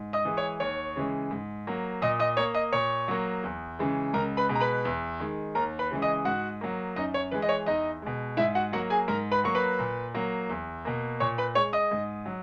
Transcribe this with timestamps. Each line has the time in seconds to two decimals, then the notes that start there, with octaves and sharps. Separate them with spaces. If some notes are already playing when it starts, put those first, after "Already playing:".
Already playing: G#2
0.13 D#5 D#6
0.25 E3 G#3
0.37 C#5 C#6
0.60 D#2 C#5 C#6
0.96 C#3 E3 G#3
1.31 G#2
1.67 F#3 A#3
2.02 A#2 D#5 D#6
2.20 D#5 D#6
2.37 A#3 C#5 C#6
2.54 D#5 D#6
2.72 A#2 C#5 C#6
3.08 F#3 A#3
3.44 E2
3.79 C#3 E3 G#3
4.14 C#2 A#4 A#5
4.37 B4 B5
4.49 B2 G#3
4.55 A#5
4.61 B4 B5
4.85 E2
5.20 D#3 G#3
5.55 D#2 A#4 A#5
5.79 B4 B5
5.91 C#3 E3 G#3
6.02 D#5 D#6
6.25 G#2 F#4 F#5
6.61 F#3 A#3
6.96 F#2 D#4 D#5
7.14 C#5
7.31 E3 G#3 B4
7.42 D#5
7.49 C#5
7.66 E2 D#4 D#5
8.02 B2 G#3
8.37 G#2 E4 E5
8.55 F#4 F#5
8.72 F#3 A#3 F#4 F#5
8.90 G#4 G#5
9.08 G#2 A#4 A#5
9.31 B4 B5
9.44 F#3 A#3 C#6
9.55 B4 B5
9.79 A#2
10.14 F#3 A#3
10.49 E2
10.85 B2 A#3
11.20 A#2 C#5 C#6
11.38 B4 B5
11.55 G#3 C#5 C#6
11.73 D#5 D#6
11.91 G#2
12.26 F#3